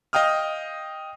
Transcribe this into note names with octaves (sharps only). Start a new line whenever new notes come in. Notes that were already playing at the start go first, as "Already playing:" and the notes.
D#5 F5 G5 D#6 F6